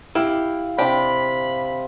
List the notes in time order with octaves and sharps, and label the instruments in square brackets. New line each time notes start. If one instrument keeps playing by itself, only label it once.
[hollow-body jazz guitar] E4 G4 [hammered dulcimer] F5
[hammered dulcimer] C3 [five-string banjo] D4 G5 [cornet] B5